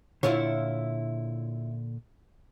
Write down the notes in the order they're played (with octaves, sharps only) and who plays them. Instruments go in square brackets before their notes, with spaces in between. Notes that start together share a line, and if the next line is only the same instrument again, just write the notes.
[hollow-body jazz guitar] A#2 D3 [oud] E4 F4 C#5